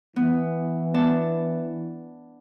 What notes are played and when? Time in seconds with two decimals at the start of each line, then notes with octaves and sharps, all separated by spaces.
0.16 E3 B3
0.94 B3 D4 A5